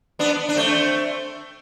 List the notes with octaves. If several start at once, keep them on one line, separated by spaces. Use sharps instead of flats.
B3 D4
D4
A3 C4